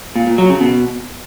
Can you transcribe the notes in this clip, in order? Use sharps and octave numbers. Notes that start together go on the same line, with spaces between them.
A#2
A#2
F#3
C#3
B2